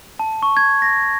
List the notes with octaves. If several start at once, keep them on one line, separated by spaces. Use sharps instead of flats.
A5
C#6
G#6
A#6